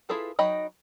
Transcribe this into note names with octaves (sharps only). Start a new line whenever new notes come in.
E4 F4 G#4 A4 B4
F#3 D#4 D#5 G5 B5